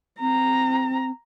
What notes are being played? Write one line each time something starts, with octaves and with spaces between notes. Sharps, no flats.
C4 A#5